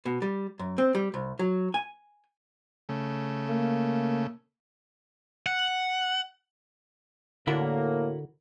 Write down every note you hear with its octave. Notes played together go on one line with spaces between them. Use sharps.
B2
G3
F#2
C4
G3
C2
F#3
G#5
C#3 A3
A#3
F#5
A2 D3 A#3 E4 F#4 A#4